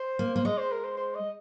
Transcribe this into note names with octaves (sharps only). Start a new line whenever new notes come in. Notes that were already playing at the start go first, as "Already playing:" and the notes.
Already playing: C5
A#3
A#3 C5
G#3 D#5
C5
A#4
C5
C5
D#5